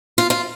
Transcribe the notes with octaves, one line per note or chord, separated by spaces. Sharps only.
F4
F4